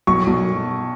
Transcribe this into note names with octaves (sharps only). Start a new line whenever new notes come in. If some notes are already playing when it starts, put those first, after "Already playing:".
B1 C#6
B1